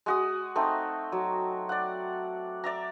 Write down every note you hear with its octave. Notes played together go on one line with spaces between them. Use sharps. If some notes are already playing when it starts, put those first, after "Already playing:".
G#3 F#4 D#6
A3 C4 D#4
F#3
D5 F#5
D5 E5 A#5